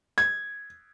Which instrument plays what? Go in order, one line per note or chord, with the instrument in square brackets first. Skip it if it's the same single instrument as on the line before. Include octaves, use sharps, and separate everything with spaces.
[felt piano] G#6